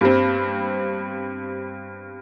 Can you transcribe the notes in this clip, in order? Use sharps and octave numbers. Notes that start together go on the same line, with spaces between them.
G2 G3 C4